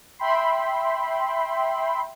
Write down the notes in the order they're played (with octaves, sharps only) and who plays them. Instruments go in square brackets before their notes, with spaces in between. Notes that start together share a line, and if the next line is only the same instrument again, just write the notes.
[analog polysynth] E5 G5 B5 C6